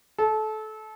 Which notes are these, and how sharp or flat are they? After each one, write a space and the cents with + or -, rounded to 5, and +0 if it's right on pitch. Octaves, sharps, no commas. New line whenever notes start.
A4 -25